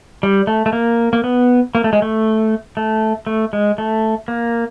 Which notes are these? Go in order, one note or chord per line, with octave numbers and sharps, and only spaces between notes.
G3
A3
A3
A#3
A#3
B3
A#3
A3
G#3
A3
A3
A3
G#3
A3
A#3